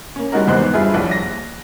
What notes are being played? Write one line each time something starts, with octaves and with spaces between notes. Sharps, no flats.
A#3 C#4
G3 G#3 D#4 F#4 A#4
G#1 E2 D#4 C5 F#6
G2 E4 F4 G#4
D#1 A#1 A#2
A#6